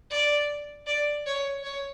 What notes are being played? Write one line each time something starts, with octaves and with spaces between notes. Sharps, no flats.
D5
D5
C#5
C#5